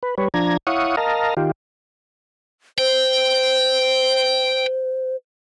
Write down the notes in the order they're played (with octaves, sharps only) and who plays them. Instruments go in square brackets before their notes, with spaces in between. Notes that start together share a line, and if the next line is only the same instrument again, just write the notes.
[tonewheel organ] B4
G3 B4 C#5
F3 D4 A#5 G#6
E4 C#5 F5 F#5 C#6 D#6
A#4 D#5 F5 A5 A#5
D#3 F4 G4
[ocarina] C5 [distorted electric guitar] G5